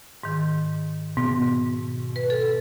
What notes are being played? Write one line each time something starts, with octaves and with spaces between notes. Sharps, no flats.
G#2 D#3
G#2 B2
B4
A4